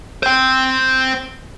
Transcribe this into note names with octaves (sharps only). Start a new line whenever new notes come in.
C5 G5